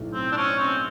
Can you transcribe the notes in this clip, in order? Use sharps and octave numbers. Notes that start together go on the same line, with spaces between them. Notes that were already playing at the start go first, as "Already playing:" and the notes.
Already playing: B1 A2 F#3
C4
D4
C#4
C4